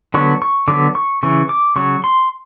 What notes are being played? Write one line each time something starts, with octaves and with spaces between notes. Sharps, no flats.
D3 F#3 B3 C#6
C#6
D3 F#3 B3 D6
C#6
C#3 E3 C#6
D6
C#3 F#3 C#6
C6